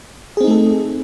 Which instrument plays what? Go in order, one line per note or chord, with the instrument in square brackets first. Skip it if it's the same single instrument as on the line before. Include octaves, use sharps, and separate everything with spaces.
[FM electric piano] G#4
C4
D#4
A3
A4